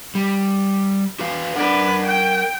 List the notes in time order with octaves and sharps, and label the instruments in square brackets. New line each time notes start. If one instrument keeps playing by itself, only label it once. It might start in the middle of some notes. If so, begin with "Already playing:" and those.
[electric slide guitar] G3
F#4 B4 F5
[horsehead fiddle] D4 B4 [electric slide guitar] A#4 F#5
[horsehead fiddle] G5